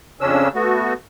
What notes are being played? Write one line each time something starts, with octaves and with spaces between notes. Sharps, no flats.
F2 C#3 C#4 D4 E6
A3 B3 F#4